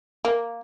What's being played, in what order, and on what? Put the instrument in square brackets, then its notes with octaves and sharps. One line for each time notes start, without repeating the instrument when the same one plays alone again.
[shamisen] A#3